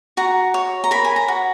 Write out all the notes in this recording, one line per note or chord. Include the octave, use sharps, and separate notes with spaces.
F#4 A#5
C#5
A#5
A#4 B5
G#5
A#5
F#4